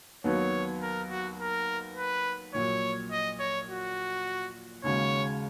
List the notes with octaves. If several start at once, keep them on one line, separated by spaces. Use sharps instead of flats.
D#2 D#3 F#3 B3 C#5
A#4
F#4
A#4
B4
A#1 A#2 F#3 C#5
D#5
C#5
F#4
D#2 C#3 G#3 C#4 F#4 C#5